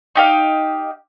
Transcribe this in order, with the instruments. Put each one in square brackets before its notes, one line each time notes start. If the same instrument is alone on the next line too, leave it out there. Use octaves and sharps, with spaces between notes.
[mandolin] D#4 G4 F5